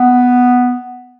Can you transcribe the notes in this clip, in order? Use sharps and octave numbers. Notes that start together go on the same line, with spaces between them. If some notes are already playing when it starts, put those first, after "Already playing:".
Already playing: B3